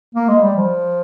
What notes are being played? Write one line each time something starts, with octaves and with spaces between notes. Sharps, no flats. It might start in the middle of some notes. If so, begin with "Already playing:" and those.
A#3
G#3
G3
F3